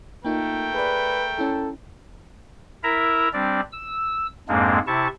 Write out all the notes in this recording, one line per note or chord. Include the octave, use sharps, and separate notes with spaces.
A3 A#3 D#4 F4 A#4 G5
G#4 B4 D5
C#4 E4 A4
E4 A#4 E5 A#5
G3 C4 D4 D5
E6
F2 G#2 G#3 A#3 C4 D4
C3 E4 A5 C#6